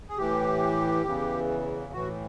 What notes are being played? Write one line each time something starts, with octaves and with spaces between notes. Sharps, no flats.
G#4
A2 E3 G4
E2 C#3 E3
A2 E3 F#4